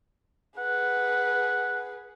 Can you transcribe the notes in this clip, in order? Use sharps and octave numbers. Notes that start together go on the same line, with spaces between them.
G#4 B4 F#5